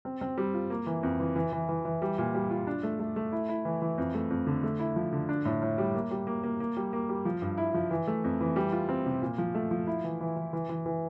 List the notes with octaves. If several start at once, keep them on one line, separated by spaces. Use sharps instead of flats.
C4
C4
G3
F4
A#3
E3
F2
E3
E3
E3
E3
E3
G3
A#2
G3
F4
D4
A3
A3
A3
E4
E4
E3
E3
F2
A3
F2
D3
A3
E4
F3
D3
D4
A2
A2
G3
A#3
G3
A#3
A#3
A#3
G3
A#3
G3
F3
G2
E4
F3
E3
A3
F2
E3
G3
F4
C4
C3
A#2
F3
A3
F3
E4
E3
E3
E3
E3
E3
E3